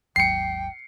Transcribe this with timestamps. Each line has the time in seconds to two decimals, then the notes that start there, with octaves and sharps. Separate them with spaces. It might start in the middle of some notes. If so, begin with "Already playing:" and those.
0.16 G#1 D#2 F#3 G5 C7 C#7